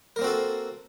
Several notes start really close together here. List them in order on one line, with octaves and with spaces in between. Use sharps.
A#4 A#3 C4 F#4 A4